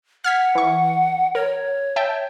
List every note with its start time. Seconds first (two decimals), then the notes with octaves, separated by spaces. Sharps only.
0.24 F#5 F6 G#6 B6
0.55 E3 C#6
1.35 A#4 C#5
1.96 E5 G5 A5